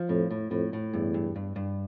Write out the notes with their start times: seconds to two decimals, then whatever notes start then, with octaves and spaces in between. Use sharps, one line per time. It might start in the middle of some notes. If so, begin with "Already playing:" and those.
Already playing: F3
0.09 F2 A2
0.31 A2
0.51 F2 A2
0.73 A2
0.93 E2 G2
1.14 G2
1.36 G2
1.56 G2